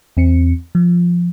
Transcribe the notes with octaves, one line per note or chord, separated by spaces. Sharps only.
E2 C4 C#7
F3